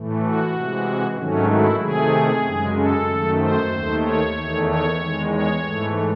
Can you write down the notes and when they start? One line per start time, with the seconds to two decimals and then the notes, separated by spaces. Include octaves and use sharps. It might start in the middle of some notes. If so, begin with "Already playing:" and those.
Already playing: A2 E3 A3
0.21 F#4
0.52 C3 E3 G#3
1.16 G#2 D#3 F#3 A3 C#4
1.48 E4
1.80 C3 D#3 A3 G#4
2.42 F#2 C#3 G#3
2.74 A4
3.06 F#2 D#3 A3
3.38 C5
3.70 D#2 D#3 A3
4.02 C#5
4.34 E2 D#3 A3
4.64 C#5
4.97 E2 D#3 G#3
5.28 C#5
5.60 G#2 E3 A3